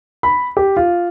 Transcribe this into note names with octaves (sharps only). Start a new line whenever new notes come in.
B5
G4
F4